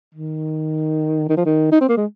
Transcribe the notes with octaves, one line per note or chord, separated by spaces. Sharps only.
D#3
D#3
F3
D#3
D#4
C4
A#3
G#3